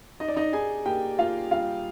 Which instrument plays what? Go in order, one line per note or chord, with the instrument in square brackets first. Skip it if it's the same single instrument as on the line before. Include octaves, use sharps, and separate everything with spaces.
[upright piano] D#4 D#5
D5
D#4 D#5
D#4 G#4 G#5
A#3 G4 G5
A#3 F4 F5
G3 F4 F5